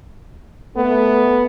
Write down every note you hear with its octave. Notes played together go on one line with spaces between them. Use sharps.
A3 B3